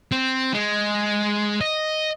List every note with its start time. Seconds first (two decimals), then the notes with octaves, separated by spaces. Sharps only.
0.12 C4
0.54 G#3
1.61 D#5